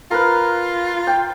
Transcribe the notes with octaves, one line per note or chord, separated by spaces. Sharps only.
F4 A#4 B4
G5